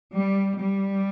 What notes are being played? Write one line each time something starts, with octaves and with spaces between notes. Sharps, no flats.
G3
G3